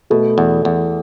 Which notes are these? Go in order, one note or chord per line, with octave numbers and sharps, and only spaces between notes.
B2 A3
E2
E2